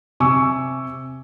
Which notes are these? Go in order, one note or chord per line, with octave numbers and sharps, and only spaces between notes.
C3 G#5 C#6 D6 E6